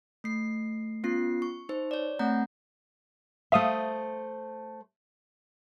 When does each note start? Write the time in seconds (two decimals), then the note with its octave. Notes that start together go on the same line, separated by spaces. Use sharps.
0.24 A3 C7
1.04 B3 C#4 F4 C7
1.42 C#6
1.69 D#4 C5
1.91 C#5 D5
2.19 A3 C4 F#5 A#5 G6
3.52 A3 C5 E5 F5 D#6